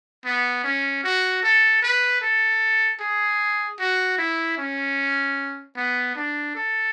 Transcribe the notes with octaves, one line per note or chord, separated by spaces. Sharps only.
B3
C#4
F#4
A4
B4
A4
G#4
F#4
E4
C#4
B3
D4
A4